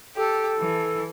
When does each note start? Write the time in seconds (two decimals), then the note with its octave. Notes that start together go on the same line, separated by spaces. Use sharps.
0.16 G4 A4
0.60 E3